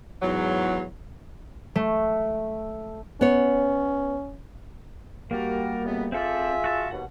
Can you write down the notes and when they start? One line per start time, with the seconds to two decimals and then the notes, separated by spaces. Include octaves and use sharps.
0.21 E2 G#2 F#3
1.75 A3
3.21 B3 C#4 C#5
5.31 G3 A#3 F#4 G4 A#4
5.85 C#2 F#2 B3
6.12 C4 F4 G#4 A4 D5 E5
6.64 F#4 A5 E6
6.91 D#2 B2 F#5